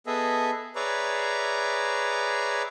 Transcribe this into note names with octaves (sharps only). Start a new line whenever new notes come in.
B3 G#4 A4 D#5 E5
G#4 B4 C#5 D5 E5 A#5